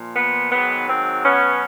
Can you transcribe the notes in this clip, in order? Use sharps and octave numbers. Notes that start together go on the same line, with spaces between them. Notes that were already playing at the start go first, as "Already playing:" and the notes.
Already playing: A#2 F3
B3
G#2 D#3 F#3 B3
C4
B2 F#3 B3 C#4